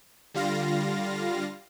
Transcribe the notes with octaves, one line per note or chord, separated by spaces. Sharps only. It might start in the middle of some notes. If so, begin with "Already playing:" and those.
D3 G3 F4 F5 A#6